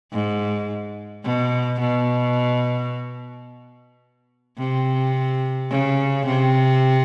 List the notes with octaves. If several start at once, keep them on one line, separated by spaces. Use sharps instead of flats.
G#2
B2
B2
C3
C#3
C3